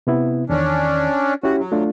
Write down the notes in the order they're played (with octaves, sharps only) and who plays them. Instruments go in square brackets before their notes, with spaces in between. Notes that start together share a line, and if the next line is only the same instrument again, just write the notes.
[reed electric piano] C3 B3 E4
[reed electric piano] E2 D#3 [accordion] C#4 D4
[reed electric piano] C#4 E4 G4 [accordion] F#4
[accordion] F#3
[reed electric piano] A3 D4 F4